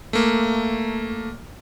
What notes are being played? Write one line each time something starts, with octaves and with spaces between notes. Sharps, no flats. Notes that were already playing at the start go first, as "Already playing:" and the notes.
A3 A#3